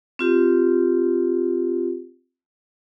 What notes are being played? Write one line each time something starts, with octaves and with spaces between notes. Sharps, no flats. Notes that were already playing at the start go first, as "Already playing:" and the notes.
C4 F4 G4